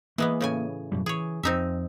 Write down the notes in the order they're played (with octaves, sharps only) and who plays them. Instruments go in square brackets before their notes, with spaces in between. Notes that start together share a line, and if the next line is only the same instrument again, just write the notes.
[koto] E3 G#3 B3 [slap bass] A#3
[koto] A2 C#3 G#5
[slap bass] F#2 B2 G3
[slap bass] E3 [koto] G#4 C#5
[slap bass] F2 [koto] C4 D#4 E5